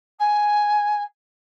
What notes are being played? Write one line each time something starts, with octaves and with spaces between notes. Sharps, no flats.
G#5